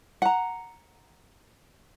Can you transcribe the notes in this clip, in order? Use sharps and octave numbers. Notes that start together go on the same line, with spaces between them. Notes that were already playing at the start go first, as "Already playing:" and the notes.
F#5 A#5